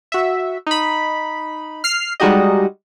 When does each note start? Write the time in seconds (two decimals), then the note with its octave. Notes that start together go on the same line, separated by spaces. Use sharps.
0.12 F#4 E5
0.67 D#4 B5
1.84 F6 C7
2.20 G3 G#3 D#4 F#4 G4 D#5